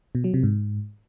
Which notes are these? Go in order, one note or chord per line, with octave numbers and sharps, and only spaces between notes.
B2
F#3
C3
G#2